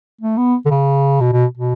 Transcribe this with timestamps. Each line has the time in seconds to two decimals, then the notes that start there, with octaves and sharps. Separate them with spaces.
0.21 A3
0.37 B3
0.66 D3
0.71 C#3
1.21 B2
1.33 B2
1.57 B2